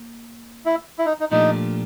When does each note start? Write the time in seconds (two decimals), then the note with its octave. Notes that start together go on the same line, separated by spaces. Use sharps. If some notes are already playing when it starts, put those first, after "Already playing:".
Already playing: A#3
0.66 E4
0.99 E4
1.06 D#4
1.20 D#4
1.31 A#2 F3 A3 D4 D#4 G4